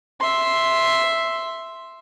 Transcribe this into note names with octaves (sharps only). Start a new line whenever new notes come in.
E5 C6